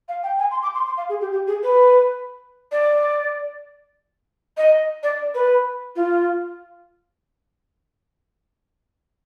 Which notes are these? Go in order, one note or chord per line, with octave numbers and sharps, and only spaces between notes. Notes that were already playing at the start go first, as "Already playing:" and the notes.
F5
G5
G#5
C6
D6
C6
C6
F5
G#4
G4
G4
G#4
B4
D5
D#5
D5
B4
F4